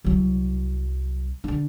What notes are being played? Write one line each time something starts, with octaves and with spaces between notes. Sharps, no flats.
C2 F#3
D3 D4